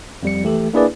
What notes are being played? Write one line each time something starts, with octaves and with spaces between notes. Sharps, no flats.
F2 G3 C#7
E3 A3 G4 A4
A#3 D4 E4 G#4 B4 D5